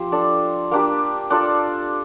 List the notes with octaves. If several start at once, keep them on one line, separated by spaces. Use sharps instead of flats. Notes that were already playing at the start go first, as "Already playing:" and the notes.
Already playing: F3 C4 G4 C5
D4 A4 D5
A#3 D4 G4
D4 F4 A4 D5